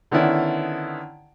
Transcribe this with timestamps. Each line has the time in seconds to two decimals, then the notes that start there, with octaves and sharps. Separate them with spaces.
0.11 D3 D#3 B3 C#4 E4 D5